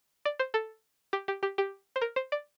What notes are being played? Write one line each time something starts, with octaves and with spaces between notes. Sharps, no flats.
D5
C5
A4
G4
G4
G4
G4
C5
A#4
C5
D5